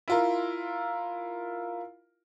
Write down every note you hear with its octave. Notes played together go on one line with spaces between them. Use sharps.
E4 F4 A#4